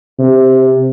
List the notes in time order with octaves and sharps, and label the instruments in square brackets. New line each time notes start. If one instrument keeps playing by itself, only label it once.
[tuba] C3